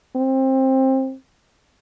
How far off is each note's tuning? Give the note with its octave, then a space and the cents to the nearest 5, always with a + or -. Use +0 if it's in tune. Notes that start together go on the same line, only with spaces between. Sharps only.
C4 +20